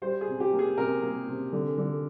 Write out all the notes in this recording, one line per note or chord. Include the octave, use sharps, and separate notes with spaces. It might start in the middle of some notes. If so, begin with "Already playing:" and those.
G3 C5
G#4
C3
G4
A#3
G#4
C3 A#4
A#3
C3
D3
D3